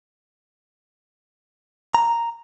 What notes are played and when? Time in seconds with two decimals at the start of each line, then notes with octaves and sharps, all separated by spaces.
1.95 A#5